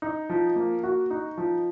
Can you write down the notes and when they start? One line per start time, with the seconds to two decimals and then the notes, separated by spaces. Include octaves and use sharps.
0.02 D#4
0.29 F3
0.56 A#3
0.84 F#4
1.10 D#4
1.38 F3